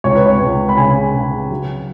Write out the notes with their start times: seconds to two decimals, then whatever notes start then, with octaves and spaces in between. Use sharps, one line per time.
0.04 C#2 C#5
0.15 B4
0.26 C#5
0.41 C#2
0.69 B5
0.77 C#3 G#5
1.14 C#3
1.50 F#3